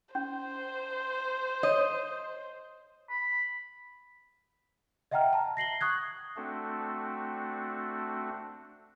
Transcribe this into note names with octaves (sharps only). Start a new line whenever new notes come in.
C#4 C5
C#5 D#5
B5
D#5 E5 F#5 G5 A#5 F6
A5 A#5
A#6 C7 F#7 G7
C#6 D#6 F#6 G#6
A3 C4 D4 F#4 A4